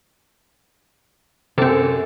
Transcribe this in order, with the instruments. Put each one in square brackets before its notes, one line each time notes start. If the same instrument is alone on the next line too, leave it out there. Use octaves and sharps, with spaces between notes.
[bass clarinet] F#2 [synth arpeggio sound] C3 C4 [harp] A4